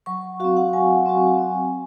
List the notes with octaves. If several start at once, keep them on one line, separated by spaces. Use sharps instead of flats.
F#3 C#6
C4 F#4 F5
F#5
F#3 G#5
C4 F#4
C4